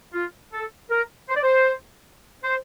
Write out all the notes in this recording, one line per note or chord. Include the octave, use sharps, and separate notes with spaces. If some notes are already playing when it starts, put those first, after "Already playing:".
F4
A4
A#4
C5
D5
C5
C5